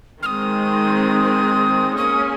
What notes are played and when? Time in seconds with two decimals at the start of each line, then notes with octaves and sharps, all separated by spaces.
0.23 D#3 G#3 C4 D#6 F6
1.97 A#3 C#4 G#4 D#6